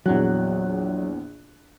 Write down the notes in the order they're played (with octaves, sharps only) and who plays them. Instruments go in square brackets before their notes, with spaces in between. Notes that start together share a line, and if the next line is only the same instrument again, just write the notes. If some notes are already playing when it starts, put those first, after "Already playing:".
[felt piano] A#1 E2 F#6 [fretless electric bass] F#3